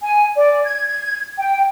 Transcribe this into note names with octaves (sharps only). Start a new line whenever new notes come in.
G#5
D5
G#6
G#6
G5